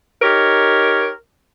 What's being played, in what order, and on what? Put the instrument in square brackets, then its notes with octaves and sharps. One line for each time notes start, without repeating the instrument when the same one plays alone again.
[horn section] D#4 G4 A#4 C#5